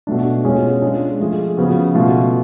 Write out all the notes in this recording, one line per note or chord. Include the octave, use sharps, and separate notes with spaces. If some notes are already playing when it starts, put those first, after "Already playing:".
B2 A3 D4
B2 G#3 C#4 F4 G#4
G#3 D4 F4 G#4
F3 A3 F4 G#4
C#3 F3 B3 F#4
B2 A3 F4